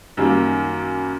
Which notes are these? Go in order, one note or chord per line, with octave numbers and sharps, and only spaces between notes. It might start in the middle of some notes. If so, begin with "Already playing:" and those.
F#2 D#3 G3 A#3